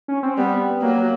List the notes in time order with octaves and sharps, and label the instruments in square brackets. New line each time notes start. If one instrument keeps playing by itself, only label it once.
[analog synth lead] C#4
C4
[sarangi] G3 [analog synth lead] B3
[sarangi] F#3 [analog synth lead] A#3